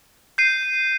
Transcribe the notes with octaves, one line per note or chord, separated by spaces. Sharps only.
G6 C7 D#7